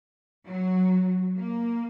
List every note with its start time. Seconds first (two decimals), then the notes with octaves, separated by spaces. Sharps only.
0.47 F#3
1.38 A#3